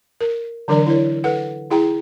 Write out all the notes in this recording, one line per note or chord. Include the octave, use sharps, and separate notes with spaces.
A#4
D3 E3 F#3 D4 A#4 D5
E4 C#5
A4 B4 F#5
E4 G#4 G5 A#5